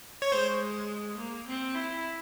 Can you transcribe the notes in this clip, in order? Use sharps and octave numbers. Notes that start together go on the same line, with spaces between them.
C#5
G#3 C5
A#3
C4
E4